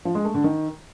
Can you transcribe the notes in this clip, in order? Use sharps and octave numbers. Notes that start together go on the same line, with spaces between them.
F3
G#3
A3
D3
D#3